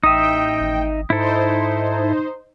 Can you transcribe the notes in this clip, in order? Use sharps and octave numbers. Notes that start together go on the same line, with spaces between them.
A1 D#4 E5 G5 D#6
G#1
G#2 D#4 E4 A4 C5